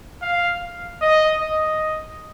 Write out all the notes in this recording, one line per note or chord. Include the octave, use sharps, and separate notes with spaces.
F5
D#5
D#5